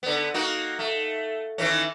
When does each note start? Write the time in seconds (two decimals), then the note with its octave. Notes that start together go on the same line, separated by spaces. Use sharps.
0.03 D3 B3
0.34 A#3 D#4 F#4
0.79 A3
1.58 D#3 E3 C#4